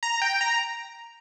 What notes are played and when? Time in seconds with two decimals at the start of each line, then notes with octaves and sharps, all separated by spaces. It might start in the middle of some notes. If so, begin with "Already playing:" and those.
0.03 A#5
0.22 G5
0.41 A#5